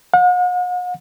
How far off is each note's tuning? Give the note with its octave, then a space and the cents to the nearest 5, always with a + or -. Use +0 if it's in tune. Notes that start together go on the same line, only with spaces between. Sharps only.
F#5 -45